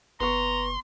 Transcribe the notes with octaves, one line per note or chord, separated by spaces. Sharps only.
F#1 B3 A#5 C6 C#6